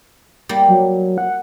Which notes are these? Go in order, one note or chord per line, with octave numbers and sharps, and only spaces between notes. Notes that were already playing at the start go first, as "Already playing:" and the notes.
G3 A#3
F#3
F#5